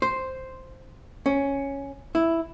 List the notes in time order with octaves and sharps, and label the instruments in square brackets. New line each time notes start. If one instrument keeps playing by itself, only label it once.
[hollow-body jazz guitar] C5
C#4
E4